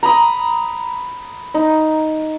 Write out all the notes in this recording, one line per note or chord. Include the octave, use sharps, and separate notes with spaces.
A#5 B5 D#6
D#4